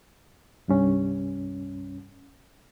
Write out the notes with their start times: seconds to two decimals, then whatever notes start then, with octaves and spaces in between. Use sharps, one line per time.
0.68 C2 G2 C#4